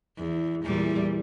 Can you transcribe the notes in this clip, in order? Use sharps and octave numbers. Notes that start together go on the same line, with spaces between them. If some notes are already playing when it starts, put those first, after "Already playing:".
E2
E2 A#2 G3